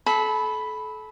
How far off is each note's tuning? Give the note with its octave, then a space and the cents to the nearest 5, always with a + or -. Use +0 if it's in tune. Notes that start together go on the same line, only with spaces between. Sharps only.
A4 -30 B5 +0